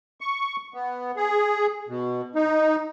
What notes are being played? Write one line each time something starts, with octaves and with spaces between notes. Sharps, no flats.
C#6
B3
G#4
B2
D#4